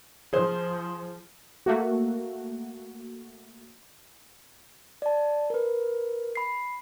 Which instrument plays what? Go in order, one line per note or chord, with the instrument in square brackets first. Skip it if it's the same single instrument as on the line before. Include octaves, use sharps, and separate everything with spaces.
[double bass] F3 [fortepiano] G#4 C5
[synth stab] A3 A#3 F#4
[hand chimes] D5 A5
A#4 B4
B5 C7